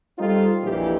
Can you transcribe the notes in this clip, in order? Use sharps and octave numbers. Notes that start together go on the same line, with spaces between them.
G3 C4 D#4 F4 A4
A#1 F2 A#2 E3 G4